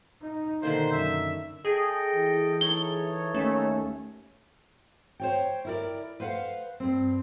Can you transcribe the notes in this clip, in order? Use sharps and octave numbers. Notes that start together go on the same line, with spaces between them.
D#4
B2 D3 D#3 A#3 C5
F#2 E5
G#4 A4 D#5 G5
E3
D#4 A4 C#5 G7
D#2 A3 C#4
C5 C#5 G5
E4 A#4 D5
B4 C5 F5 F#5
G2 C4